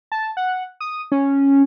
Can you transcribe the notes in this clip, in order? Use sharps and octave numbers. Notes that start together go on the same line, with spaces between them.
A5
F#5
D#6
C#4